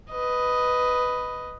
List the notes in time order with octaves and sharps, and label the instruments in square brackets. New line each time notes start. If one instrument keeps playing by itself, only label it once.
[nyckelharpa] B4 D#5